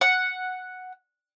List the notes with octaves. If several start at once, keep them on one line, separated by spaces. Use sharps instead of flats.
F#5